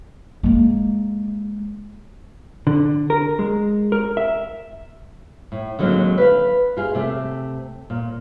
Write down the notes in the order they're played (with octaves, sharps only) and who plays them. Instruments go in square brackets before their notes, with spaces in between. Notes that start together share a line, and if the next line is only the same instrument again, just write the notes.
[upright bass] G#3 A#3
[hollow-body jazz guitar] D3
A#4
G#3
A#4
E5
[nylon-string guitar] A2
D3 D#3 F#3 G#3 A#3 C4
B4 F5
F4 G#4 F5
C3 A3
A#2